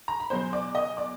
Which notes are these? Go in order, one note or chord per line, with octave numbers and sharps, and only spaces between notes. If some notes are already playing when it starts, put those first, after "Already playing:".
A#5
B5
E2 B2 F#3 C5 C6
D5 D6
D#5 D#6
D5 D6